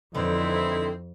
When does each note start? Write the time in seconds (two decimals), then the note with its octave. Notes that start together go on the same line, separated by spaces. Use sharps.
0.15 F2 D3 E3 C4 D#4 E4